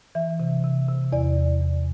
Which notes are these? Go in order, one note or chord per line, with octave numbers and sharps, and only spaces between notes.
E3 E5
C3
C3
C3
E2 D5
E2
E2